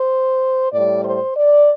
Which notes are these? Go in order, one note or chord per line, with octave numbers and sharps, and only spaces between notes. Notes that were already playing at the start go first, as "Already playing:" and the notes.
Already playing: C5
A2 G3 D5
C5
D5